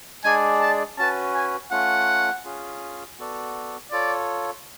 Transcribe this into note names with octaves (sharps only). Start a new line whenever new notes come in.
G#3 D4 G#4 D5 G#5
A5
C#4 F#4 B4 A5
G#5
A3 C#4 F4 F#5
C#4 F4 G#4
B3 F#4 A4 D5
F4 A4 C#5 D5